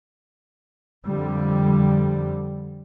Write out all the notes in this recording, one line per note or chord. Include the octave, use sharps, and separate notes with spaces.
F2 D3 G3